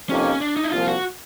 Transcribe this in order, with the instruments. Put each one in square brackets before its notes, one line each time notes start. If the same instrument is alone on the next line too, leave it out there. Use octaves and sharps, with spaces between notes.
[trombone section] F2 C3 F3 A#3 D#4 [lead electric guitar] C#4
[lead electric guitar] D4
D#4
E4
[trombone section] C2 A#2 F3 [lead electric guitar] F4
[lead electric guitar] F#4